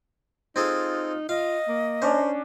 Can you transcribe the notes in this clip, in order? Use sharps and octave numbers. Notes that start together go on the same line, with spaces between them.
C4 D#4 F4 G#4 A4
F4 D#5 F5
A#3
C#4 D4 C5